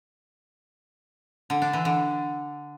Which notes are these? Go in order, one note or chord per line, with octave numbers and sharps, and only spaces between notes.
D3
D4
E3
D3